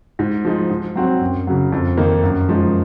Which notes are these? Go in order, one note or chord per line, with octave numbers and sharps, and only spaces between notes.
G#2
F3 G#3 D#4
G#2
F#3 C4 F#4
F#2
C#3 F#3
F2
D#3 A#3 D#4
F#2
F3 G#3 D#4